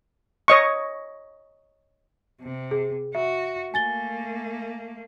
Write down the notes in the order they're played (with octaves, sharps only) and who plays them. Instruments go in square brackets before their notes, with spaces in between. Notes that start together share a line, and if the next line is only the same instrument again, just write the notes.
[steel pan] C#5 D#5 C#6
[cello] C3
[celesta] G#4
[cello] F#4 [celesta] E5
[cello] A3 A#3 [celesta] G#5 A6 G7